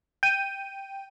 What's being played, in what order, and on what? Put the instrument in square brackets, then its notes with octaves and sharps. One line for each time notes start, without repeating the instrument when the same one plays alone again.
[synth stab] G5 D#7